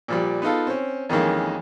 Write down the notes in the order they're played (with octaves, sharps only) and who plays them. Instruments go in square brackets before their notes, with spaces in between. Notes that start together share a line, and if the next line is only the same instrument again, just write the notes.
[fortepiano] A#2 F3 G3
B3 D#4 F4 A4
C4 C#4
F2 D#3 E3 G#3 A#3 C#4